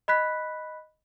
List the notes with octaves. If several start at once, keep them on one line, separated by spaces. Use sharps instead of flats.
D#5 B5 F#6 B6